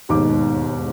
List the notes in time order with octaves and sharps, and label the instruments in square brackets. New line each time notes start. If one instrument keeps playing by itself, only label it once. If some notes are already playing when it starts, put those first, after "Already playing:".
[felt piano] E1 D#2 G#2 D#3 D6